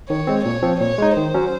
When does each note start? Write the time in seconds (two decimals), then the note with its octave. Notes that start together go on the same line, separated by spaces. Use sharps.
0.09 D#3 C#5
0.27 G#3 C4
0.45 A#2 C#5
0.62 F3 C4
0.80 A#2 C#5
0.98 G#3 D#4
1.16 D#3 C5
1.34 F#3 C#4